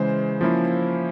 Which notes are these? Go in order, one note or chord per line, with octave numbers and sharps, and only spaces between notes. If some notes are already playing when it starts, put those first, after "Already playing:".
Already playing: C#3 E3 G#3 C5
F3 A#3 C#4 E4